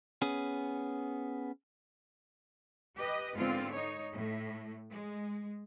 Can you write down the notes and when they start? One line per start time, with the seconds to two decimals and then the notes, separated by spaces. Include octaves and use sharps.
0.22 B3 C#4 G#4
2.96 G4 B4 D#5
3.35 G#2 D3 B3 C4 F4
3.72 D#4 C#5
4.14 A2
4.91 G#3